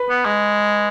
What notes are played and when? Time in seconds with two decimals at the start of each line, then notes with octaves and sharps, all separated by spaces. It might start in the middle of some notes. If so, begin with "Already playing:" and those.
Already playing: B4
0.10 B3
0.26 G#3